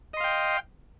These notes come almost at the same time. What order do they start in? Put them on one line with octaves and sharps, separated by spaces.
D#5 C6 F5 G5